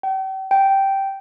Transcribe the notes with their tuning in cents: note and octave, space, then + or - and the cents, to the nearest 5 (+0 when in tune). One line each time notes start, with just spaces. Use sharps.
G5 -40
G5 -5